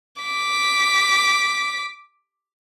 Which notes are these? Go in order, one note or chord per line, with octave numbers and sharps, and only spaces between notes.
D6 B6